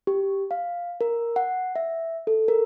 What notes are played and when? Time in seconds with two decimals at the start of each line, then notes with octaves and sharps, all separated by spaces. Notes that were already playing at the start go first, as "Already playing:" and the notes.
0.07 G4
0.51 F5
1.01 A#4
1.36 F#5
1.76 E5
2.27 A4
2.48 A#4